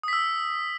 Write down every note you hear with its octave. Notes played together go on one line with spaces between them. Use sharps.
D#6 E6 B6